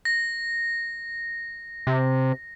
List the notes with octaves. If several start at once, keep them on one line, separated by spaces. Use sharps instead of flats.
A#6
C3